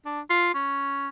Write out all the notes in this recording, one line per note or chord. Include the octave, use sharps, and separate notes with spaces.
D4
F4
C#4